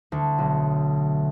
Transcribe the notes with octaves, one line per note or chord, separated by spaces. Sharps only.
D2
B1